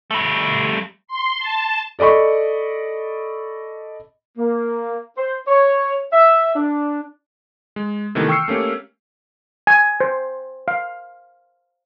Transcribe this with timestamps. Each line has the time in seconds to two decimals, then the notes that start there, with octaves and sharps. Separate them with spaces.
0.11 G3 A3
1.08 C6
1.39 A5
1.99 A4 D5 D#5 B5 C#6
4.38 A#3
5.18 C5
5.48 C#5
6.13 E5
6.54 D4
7.76 G#3
8.15 C3 D#3 E3 A3 B3
8.28 G5 C#6 E6 F6 C7 C#7
8.48 A3 A#3 C#4 G4
9.67 G#5
10.00 C5
10.68 F5